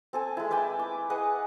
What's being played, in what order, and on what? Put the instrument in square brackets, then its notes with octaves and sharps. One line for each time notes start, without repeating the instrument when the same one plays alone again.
[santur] C4 A4 G#5
G#3 E4
B4 D5 G5 G#5
D6
G#4 B4 D#5 F#5